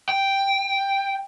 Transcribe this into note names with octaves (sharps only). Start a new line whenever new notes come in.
G5